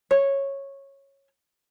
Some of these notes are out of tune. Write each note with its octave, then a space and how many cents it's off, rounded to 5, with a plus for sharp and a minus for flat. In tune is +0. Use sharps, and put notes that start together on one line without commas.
C#5 -10